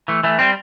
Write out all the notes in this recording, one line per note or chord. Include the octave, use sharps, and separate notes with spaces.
E3 A3
E3 A3
G3 C4